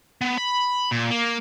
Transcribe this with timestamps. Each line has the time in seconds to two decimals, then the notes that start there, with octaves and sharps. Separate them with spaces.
0.21 B3
0.37 B5
0.91 A#2
1.10 A#3